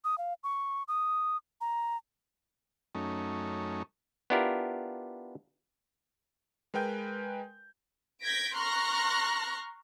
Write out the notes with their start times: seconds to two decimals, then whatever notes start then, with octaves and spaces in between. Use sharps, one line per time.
0.04 D#6
0.18 F5
0.44 C#6
0.88 D#6
1.61 A#5
2.95 F#2 A3 C#4 D#4
4.30 B3 D4 E4 F4 G4 A#4
6.74 G#3 A#4 B4 G5 G#5 G6
8.23 G6 G#6 A#6 B6 D7
8.56 A#5 C6 C#6 F6 F#6 A#6